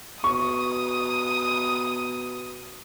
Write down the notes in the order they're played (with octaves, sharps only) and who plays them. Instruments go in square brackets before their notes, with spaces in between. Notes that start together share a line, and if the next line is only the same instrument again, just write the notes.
[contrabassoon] B2 [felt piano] C#6 [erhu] D#6